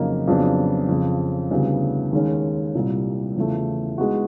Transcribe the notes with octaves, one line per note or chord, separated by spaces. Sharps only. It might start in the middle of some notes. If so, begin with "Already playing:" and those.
Already playing: F2 C#3 F#3 A#3 D#4
F2 C#3 F#3 B3 D4
F2 C#3 F3
D2 C#3 E3 G3 B3
D#2 D#3 G#3 C#4
C2 A#2 G3
E2 C#3 F3 A3
E3 G#3 B3 D#4 F#4